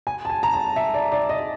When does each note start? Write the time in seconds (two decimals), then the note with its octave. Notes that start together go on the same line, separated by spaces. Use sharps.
0.07 G#5
0.25 A5
0.30 G#5
0.43 A#5
0.54 A5
0.76 E5
0.94 D5
1.12 D5
1.29 D#5